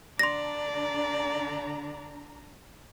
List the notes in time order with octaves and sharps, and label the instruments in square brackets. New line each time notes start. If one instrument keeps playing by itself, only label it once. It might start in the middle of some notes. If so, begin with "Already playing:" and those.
[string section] D3 D4 A#5 [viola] D5 [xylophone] C6 A#6